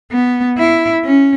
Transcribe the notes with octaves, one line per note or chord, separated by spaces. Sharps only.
B3
E4
C#4